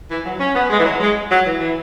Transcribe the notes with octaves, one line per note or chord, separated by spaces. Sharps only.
E3
F#3
C#4
B3
G#3
E3
F#3
G#3
F#3
E3
E3